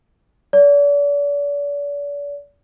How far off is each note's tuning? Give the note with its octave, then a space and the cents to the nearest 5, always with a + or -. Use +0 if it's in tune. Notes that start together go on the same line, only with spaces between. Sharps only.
D5 -40